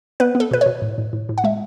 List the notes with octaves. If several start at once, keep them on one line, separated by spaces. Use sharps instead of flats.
B3 B4
B3
A4
B2 B4
C#5
B2
A2
A2
A2
A2
F#5
G#3 E5